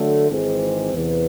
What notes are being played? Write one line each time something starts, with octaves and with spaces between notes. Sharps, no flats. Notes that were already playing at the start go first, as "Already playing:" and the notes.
Already playing: D3 F#3 A3
G#1 G#2 E3 G#3 C4
E2 C3 E3